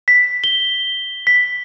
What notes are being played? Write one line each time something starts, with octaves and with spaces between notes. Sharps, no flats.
B6
G7
B6